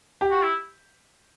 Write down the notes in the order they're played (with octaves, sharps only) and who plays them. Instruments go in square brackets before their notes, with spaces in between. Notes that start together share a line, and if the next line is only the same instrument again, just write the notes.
[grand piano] G4
[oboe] F#4
E4